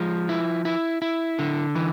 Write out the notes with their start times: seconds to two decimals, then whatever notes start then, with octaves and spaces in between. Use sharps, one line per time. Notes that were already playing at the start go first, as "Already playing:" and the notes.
Already playing: F3 G#3
0.29 E4
0.65 E4
1.02 E4
1.39 D3
1.75 E3